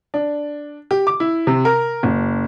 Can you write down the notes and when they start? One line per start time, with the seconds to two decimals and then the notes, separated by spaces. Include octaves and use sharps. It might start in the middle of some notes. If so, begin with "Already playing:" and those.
0.14 D4
0.91 G4
1.07 D6
1.20 E4
1.47 C3
1.65 A#4
2.03 F#1